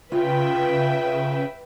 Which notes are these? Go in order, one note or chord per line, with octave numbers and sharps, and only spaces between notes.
C#3 F4 B4 E5 G5